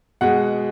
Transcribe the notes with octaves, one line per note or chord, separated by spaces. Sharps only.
B2 G#3 F#5